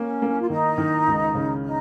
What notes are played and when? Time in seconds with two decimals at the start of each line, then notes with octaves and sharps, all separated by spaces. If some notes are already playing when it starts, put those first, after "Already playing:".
Already playing: A#3 C#4
0.22 A#3
0.41 F4
0.50 D#3 D#4
0.78 D#3
1.07 C#2
1.35 C#3
1.64 D#4